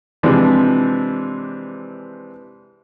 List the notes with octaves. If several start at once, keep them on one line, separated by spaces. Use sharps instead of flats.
C3 E3 F3 G#3 C4 D4